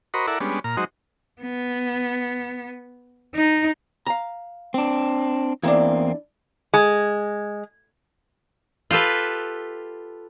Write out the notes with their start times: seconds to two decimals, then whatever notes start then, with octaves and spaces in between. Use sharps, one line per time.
0.14 F#4 A#4 C5 D#5 B5 C#6
0.27 E4 A4 A#4 D5 E5 F#5
0.40 G3 G#3 B3 C#4 D4
0.64 A#2 A#5 F6
0.77 F#3 G#3 D#4 F#4 C5 D#5
1.42 B3
3.35 D#4
4.07 F5 A#5
4.74 C4 D4
5.63 E2 A#3 C4 D4 E4
6.74 G#3
8.91 F4 G4 A4 B4